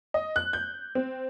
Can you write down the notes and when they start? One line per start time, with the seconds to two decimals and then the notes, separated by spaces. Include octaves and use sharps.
0.14 D#5
0.36 F#6
0.53 G6
0.95 C4